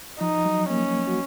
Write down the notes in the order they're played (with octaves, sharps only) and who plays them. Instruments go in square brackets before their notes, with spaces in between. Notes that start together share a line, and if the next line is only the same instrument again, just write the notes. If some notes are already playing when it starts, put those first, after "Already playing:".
[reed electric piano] F3 [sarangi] D#4
[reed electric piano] F#3
[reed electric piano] A#3 [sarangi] C#4
[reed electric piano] F#4